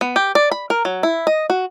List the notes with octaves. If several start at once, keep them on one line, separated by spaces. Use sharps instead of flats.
B3
G4
D5
B5
A#4
F#3
E4
D#5
F#4